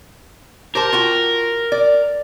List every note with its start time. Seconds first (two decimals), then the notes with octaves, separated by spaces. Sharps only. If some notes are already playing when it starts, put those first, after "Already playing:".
0.75 G4 A#4 C5 A5
0.92 F4 F#4 G5
1.72 D5